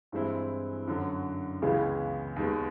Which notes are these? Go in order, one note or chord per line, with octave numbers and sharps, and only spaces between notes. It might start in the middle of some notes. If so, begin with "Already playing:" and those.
G2 E3 G#3 C4 E4
F#2 D3 F#3
C#2 C#3 E3 G#3 B3
D#2 D#3 G#3 B3